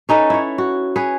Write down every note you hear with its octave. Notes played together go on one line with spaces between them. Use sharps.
C#4 D#4 A4 B4
E4 C#5
F#4
G#4 B4 C#5